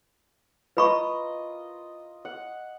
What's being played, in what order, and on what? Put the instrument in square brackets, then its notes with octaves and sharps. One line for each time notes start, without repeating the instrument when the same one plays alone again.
[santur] F4 A#4 D#5 [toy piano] B4 B5 C#6
[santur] F#5